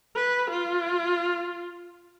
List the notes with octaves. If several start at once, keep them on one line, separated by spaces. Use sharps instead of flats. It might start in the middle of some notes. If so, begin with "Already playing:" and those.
B4
F4